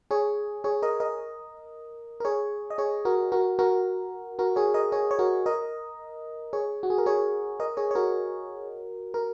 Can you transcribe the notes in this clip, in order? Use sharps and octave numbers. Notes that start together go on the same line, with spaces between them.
G#4 C#5
G#4 C#5
A#4 D#5
A#4 D#5
A#4
G#4 C#5
D#5
G#4 C#5
F#4 A#4
F#4 A#4
F#4 A#4
F#4 A#4
G#4 C#5
A#4 D#5
G#4 C#5
C#5
F#4 A#4
A#4 D#5
G#4 C#5
F#4
G#4
A#4
G#4 C#5
A#4 D#5
G#4 C#5
C#5
F#4 A#4
A#4